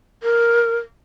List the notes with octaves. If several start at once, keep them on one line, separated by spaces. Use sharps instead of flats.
A#4